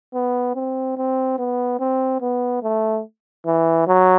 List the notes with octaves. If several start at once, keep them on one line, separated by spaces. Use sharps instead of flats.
B3
C4
C4
B3
C4
B3
A3
E3
F#3